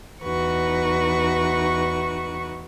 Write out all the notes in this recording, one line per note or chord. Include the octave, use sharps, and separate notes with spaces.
E2 D#4 F#4 B4 C#6